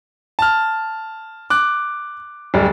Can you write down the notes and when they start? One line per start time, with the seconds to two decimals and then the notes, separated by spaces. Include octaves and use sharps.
0.39 A5 F6
1.50 D6 F#6
2.54 D1 G3